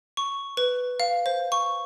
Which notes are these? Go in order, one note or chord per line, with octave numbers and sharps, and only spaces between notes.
C#6
B4
F5
C5
C#6